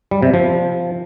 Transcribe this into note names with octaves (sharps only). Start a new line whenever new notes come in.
G3
C3
F3